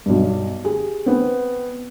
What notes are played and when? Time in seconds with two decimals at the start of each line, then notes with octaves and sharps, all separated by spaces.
0.06 B1 G2
0.64 G4 G#4
1.06 B3 C4